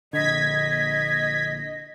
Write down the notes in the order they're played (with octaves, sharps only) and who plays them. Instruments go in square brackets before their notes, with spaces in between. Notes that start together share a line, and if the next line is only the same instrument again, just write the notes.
[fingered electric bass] A#1 D3 [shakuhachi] D#5 [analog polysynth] G#6 B6